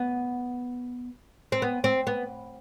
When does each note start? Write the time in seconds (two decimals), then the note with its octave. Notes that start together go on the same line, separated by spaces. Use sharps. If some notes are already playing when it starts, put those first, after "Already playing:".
Already playing: B3
1.52 C4
1.62 B3
1.84 C4
2.07 B3